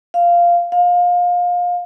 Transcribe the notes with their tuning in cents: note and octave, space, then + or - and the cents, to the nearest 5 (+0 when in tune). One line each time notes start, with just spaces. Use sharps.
F5 -10
F5 +25